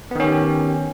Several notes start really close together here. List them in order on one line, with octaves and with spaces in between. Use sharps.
B3 D#3 C#4 G4